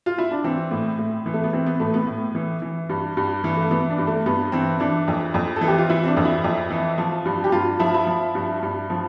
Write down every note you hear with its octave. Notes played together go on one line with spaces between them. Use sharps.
F4
E4
D4
E3 C4
A2
A2
E3
A3
B3
E3 C4
B3
A2 A3
B3
A2
E3
E3
G2
G2
E3
A3
E3 B3
D4
G2
A3
G2 B3
E3 C4
E3 D4
F2
F2
A4
E3
G4
F4
E3 E4
C4
D4
F2
E4
F2
E3
F3
G2
G4
G2 F4
F3 E4
E4
F3
G2
G2
F3